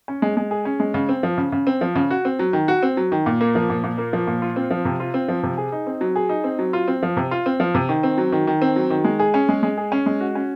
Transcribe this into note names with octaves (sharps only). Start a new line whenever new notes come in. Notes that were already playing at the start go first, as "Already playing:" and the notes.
C#4
G#3
G#3
G#4
C#4
G#3
C#3
C4
F3
C#3
C#3
C4
F3
C#3
F#4
C4
F#3
D#3
F#4
C4
F#3
D#3
A#2
A#3
F3
A#2
A#2
A#3
F3
A#2
F4
C4
F3
C3
F4
C4
F3
C3
G#4
D#4
C4
F#3
G#4
D#4
C4
F#3
F4
C4
F3
C3
F4
C4
F3
C3
D#3
C4
F#3
D#3
D#3
C4
F#3
D#3
G#3
G#4
C#4
G#3
G#3
G#4
C#4
G#3
F#4
C#4